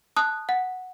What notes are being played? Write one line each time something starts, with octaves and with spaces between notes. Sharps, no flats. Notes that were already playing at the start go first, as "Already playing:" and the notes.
A5 D#6 F#6
F#5